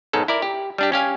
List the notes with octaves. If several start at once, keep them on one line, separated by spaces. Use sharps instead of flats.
B1 G#2 G#3 A4
E4 A#4 D5
G4
G3 D4 G4
C#4 G4 F5 G#5